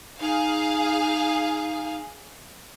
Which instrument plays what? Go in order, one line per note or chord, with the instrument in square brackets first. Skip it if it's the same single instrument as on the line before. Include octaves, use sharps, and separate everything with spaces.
[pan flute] D#4 [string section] G#4 F5